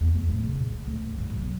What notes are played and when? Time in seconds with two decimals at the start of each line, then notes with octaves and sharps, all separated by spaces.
0.01 E2
0.15 G#3
0.28 D1
0.43 C#3
0.56 A#2
0.71 C#2
0.87 D2
1.06 F#2
1.18 C#2
1.30 B1
1.41 F#3